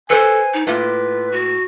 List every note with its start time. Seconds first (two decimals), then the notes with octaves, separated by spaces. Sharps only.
0.10 A4 B4 C5 G#5
0.54 D#4
0.67 A2 A#3 F4 B4
1.32 F#4